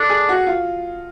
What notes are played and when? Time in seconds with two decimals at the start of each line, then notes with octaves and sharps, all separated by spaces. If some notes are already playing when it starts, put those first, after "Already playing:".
Already playing: D4 A4
0.09 G#4
0.29 F#4
0.47 F4